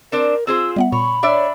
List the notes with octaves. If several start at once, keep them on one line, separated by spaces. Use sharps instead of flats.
C4 D4 A#4 C5
C4 F4 G#4 C5 E6
G3 B3 E5 F#5
A#2 C#5 B5 C#6
D4 C#5 D5 E5